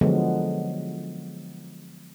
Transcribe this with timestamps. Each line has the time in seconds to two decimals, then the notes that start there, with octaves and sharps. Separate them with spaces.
0.01 D3 F3 F#3 G#3 B3